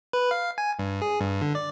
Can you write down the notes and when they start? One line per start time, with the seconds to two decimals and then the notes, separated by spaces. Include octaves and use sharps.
0.13 B4
0.31 F5
0.58 G#5
0.79 G2
1.02 G#4
1.21 G2
1.42 D3
1.55 D5